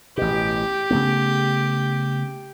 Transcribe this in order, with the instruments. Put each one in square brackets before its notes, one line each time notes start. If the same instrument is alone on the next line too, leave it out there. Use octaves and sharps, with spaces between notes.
[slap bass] A1 B2 [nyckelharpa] G4
[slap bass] C#3 A3 B3